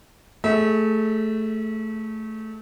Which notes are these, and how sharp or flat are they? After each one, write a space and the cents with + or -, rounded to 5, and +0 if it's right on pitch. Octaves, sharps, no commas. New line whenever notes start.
A3 +0 G#4 +0 E5 -35